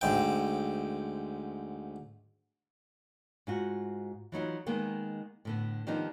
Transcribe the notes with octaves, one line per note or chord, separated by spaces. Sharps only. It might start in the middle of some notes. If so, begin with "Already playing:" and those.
D2 G#2 G5
G#2 F4 F#4
E3 F#3 D#4 F4
D#3 G#3 A#3 B3
A2 D3 B3
D#3 F3 G3 B3 D4 D#4